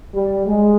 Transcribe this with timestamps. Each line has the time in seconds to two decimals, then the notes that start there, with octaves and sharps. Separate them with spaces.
0.14 G3
0.47 G#3